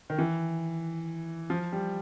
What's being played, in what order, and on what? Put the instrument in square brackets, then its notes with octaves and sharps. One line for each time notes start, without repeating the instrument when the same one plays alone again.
[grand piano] D#3
E3
F3
G3